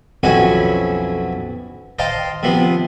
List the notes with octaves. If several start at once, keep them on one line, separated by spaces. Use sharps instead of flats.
B1 F2 C#4 E4 F#4 G#5
C5 D#5 F5 G5 A5
C3 F3 B3